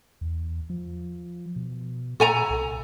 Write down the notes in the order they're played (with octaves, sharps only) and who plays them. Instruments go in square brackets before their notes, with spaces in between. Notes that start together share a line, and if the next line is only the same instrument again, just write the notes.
[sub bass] E2
F3
B2
[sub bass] A#2 [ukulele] A4 G#5 A#5
[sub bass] C2